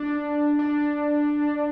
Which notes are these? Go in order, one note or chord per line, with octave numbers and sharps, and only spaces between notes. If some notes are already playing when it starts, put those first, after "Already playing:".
Already playing: D4
D4